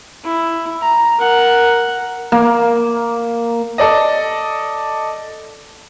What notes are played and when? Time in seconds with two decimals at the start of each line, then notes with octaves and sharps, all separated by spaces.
0.24 E4
0.81 A#5
1.19 A#4 F#5
2.32 A#3
3.78 A4 D5 D#5